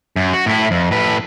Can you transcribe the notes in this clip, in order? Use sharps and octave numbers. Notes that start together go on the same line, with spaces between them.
F#2
F#4
A2 E4
F2
A2 B4